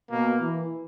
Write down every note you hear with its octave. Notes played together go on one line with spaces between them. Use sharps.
B2 A#3
E3